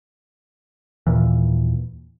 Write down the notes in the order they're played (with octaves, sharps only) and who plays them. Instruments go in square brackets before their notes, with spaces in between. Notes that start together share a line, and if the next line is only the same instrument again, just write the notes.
[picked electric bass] D#2 A#2 E3